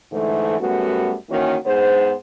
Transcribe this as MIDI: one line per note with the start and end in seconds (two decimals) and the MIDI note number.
0.12 0.59 44
0.12 0.59 50
0.12 0.59 52
0.12 0.59 57
0.59 1.15 42
0.59 1.15 55
0.59 1.15 57
0.59 1.15 59
0.59 1.15 66
1.30 1.56 51
1.30 1.56 52
1.30 1.56 58
1.30 1.56 61
1.30 1.56 66
1.66 2.13 44
1.66 2.13 59
1.66 2.13 68
1.66 2.13 72